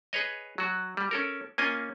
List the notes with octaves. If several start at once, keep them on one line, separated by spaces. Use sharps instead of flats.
G#4 B4 C#5 D#5
F#3 F#4
G3
C#4 A4 A#4
A#3 C#4 F4 D#5 G#5